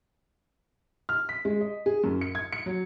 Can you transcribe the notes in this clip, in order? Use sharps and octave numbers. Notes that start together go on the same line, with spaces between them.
F6
B6
G#3
D#5
G#4
F#2
C#7
G#6
C#7
F#3